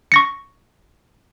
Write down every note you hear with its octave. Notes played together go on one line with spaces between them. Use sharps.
C#6 A#6 C#7